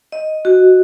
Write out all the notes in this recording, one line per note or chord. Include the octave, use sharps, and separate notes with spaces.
D#5
F#4